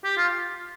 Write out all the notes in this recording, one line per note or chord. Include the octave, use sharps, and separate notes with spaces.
G4
F4